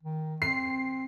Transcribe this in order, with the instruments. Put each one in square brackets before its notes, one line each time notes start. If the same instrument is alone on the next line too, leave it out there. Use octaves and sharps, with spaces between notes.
[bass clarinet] D#3
[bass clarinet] C4 [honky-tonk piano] C7